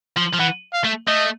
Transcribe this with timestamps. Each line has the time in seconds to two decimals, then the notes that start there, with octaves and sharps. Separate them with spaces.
0.17 F3
0.34 F3
0.39 E3 F#5
0.73 F5
0.84 A3
1.07 A3 D#5